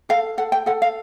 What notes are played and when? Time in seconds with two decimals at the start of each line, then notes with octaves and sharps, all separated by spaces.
0.09 A4 F5
0.38 A4 F#5
0.52 G5
0.66 A4 F#5
0.82 F5